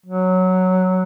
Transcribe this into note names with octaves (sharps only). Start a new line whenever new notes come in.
F#3